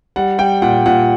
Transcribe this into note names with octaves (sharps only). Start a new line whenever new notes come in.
G3 F#5
G3 G5
A#2 F#5
A#2 F#5